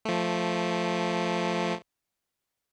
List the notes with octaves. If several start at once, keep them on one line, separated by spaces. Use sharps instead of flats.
F3 A3